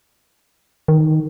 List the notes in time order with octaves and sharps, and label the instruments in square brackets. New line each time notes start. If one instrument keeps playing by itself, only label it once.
[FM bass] D#3